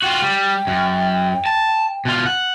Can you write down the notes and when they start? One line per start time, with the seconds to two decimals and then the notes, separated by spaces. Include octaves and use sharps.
0.02 F4 F#4 G5
0.22 G3
0.67 F#2
1.46 A5
2.05 B2 F4
2.26 F#5